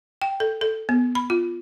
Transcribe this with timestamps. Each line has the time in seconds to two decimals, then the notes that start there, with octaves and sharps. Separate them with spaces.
0.22 G5
0.40 A4
0.61 A4
0.89 B3
1.15 B5
1.30 F4